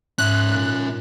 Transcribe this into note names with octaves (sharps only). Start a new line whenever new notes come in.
G#2 C#4 E5 F#6
A#2